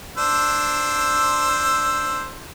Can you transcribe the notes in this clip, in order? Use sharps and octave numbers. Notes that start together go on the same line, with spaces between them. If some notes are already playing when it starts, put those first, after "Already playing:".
D4 C5 E6